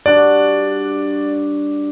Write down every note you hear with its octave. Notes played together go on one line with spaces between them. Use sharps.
G2 D4 F#4 D5